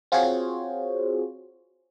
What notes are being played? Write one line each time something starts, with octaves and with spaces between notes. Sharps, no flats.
C4 F4 F#4 G#4 C5 C#5